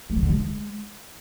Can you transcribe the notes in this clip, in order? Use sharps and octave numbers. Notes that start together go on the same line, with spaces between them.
A3
D#3
D3
G#3